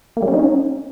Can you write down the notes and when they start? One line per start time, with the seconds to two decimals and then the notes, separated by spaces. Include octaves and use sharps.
0.17 A#3
0.22 G3
0.28 C#4
0.33 D#4
0.39 C#4